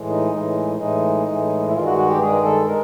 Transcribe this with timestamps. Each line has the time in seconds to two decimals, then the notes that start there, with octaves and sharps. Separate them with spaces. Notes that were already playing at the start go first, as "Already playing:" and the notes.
Already playing: A2 E3 G#3
0.09 D#4
0.33 A2 E3 G#3
0.79 A2 E3 G#3 D#4
1.27 A2 E3 G#3
1.69 E4
1.74 G2 D#3 G#3 F4
1.86 F#4
1.98 F#4
2.09 G4
2.20 G2 D#3 G#3 G#4
2.45 A4
2.68 G#3 A#4